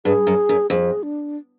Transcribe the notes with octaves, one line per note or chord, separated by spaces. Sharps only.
G2 G#4
F#2
F#2
F2 G#4
D4